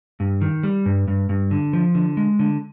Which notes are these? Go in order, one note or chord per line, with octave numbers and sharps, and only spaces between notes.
G2
D#3
G3
G2
G2
G2
D3
F3
D3
G#3
D3